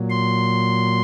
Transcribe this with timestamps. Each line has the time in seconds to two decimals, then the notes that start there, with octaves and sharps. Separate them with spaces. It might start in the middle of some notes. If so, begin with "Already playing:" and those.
Already playing: A#2 F#3
0.10 C6